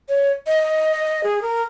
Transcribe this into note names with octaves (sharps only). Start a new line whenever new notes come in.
C#5
D#5
G#4
A#4